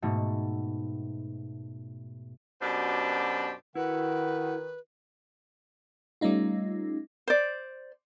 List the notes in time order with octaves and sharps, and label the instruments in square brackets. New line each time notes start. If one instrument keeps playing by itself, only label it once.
[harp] G#2 B2 A3
[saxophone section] F#2 B2 D4 G4 C5
[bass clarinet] D#3 [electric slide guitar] E4 F#4 [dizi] B4 [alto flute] F#5
[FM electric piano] G3 A3 C#4 D#4 F4
[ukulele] C5 D5